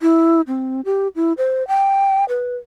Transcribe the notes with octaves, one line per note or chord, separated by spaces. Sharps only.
E4
C4
G4
E4
C5
G5
B4